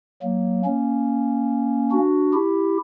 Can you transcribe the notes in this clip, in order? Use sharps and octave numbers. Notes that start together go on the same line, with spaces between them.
F#3 A#3
A#3 C#4
D4 F#4
E4 G4